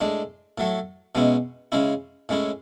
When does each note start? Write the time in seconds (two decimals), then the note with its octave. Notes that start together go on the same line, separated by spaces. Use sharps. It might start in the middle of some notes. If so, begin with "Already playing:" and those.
0.01 A2 G#3 D4
0.58 A2 F#3 A3
1.15 B2 G#3 C#4 E4
1.72 C#3 G#3 C#4 E4
2.29 A2 G#3 C#4 E4